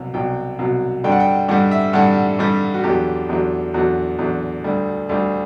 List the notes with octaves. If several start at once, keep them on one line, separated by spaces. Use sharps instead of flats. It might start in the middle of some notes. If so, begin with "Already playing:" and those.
Already playing: C2 B2 F#3
C2 B2 F#3 G5
C2 B2 F#3
G2 D3 G3 G5
F#5
G5
G2 D3 G3 F#5
E5
G2 D3 G3 F#5
G2 D3 G3
F#4
E2 D3 F#3 G4
E2 D3 F#3
E2 D3 F#3 F#4
E2 D3 F#3
D2 D3 G3
D2 D3 G3